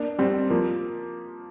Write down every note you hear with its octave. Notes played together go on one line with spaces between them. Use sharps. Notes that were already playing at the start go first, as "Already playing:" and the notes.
Already playing: A#3 D4
G3 C4
F3 A#3